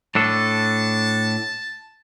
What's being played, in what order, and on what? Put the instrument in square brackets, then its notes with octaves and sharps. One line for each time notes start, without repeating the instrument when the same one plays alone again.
[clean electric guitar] A2 D4 A4 [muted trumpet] A5